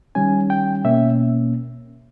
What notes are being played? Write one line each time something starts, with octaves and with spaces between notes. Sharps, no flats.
D#3 G3 C#4 G#5
G5
B2 A#3 C#4 E5